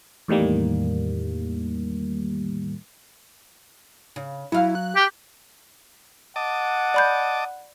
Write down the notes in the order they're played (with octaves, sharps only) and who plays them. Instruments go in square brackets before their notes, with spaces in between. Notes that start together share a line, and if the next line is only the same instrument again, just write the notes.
[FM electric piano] E2 A2 D#3 G3 A#3
[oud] C#3
[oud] F#3 F5 [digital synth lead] E4
[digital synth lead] F#6
[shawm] G4
[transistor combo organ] D#5 A5 D6 [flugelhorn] F#5
[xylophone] D5 B5 G6